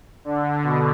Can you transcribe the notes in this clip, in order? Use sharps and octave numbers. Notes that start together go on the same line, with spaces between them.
D3
B2